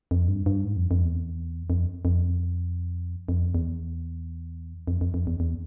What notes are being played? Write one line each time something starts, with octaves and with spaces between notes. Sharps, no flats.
F2
G2
G2
G#2
F2
F2
E2
F2
F2
F2
E2
F2
F2
F2
E2
E2